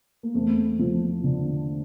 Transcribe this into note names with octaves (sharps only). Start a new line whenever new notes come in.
A#3
E2 A3 C4
F3
D3